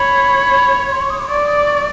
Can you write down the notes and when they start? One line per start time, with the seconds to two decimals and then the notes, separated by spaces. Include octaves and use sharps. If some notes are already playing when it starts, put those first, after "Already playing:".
Already playing: C#5 B5
0.91 C6
1.01 C#6
1.10 D#6
1.19 D6
1.25 C6
1.29 D5 C#6
1.38 D6
1.48 D#6
1.57 D6
1.67 C#6